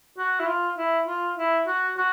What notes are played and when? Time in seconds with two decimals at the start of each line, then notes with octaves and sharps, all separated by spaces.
0.18 F#4
0.39 E4
0.47 F4
0.78 E4
1.07 F4
1.38 E4
1.67 F#4
1.97 F#4